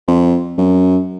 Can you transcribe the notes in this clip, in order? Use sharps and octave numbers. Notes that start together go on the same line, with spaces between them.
F2
F#2